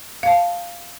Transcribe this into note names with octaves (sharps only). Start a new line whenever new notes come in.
F5 A5